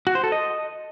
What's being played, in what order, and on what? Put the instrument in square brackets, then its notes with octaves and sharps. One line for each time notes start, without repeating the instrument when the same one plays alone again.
[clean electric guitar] F#4
C5
A4
D#5